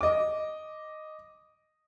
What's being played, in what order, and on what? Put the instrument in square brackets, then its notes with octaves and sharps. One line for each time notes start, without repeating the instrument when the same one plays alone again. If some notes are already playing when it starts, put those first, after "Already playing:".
[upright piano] D#5 D6